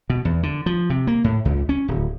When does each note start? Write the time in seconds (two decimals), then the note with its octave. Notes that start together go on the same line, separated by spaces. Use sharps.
0.10 B2
0.25 E2
0.43 D3
0.66 F3
0.90 C3
1.07 A#3
1.24 A2
1.45 C#2
1.69 C#4
1.88 D1